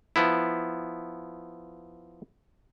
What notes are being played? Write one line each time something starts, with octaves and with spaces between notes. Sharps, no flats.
F3 B3 E4